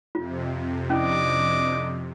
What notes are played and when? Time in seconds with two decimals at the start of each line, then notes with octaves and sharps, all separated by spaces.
0.15 F2 C3 F4
0.90 C#4 D4 E4 D#5 D6